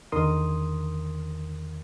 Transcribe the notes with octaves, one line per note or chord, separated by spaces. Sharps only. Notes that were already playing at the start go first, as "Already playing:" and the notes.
E2 D3 D#3 A#4 C6 D#6